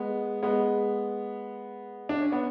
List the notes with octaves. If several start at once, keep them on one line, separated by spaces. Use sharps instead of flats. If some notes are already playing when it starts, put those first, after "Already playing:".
Already playing: G#3 B3
G#3 B3
D4
C#4
B3